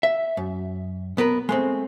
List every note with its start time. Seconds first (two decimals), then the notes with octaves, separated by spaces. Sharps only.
0.03 E5
0.37 F#2
1.17 B1 B3 A#4 B4
1.49 G#3 A3 C4